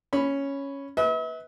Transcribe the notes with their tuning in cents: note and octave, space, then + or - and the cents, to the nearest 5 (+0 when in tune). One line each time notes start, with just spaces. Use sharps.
C#4 +0 B5 +0
B4 +0 E5 -45